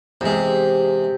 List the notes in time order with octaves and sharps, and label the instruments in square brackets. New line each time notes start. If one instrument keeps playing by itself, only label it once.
[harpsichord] E2 G#3 [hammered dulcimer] C3